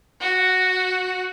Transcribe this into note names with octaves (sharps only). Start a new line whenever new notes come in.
F#4